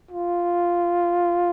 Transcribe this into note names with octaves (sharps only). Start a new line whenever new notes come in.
F4